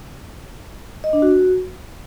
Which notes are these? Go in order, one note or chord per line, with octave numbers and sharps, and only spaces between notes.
D#5
D4
F#4